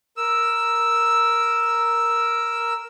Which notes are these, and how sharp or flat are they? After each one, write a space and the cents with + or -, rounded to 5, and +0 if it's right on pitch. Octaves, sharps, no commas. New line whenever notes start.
A#4 +0 E6 +0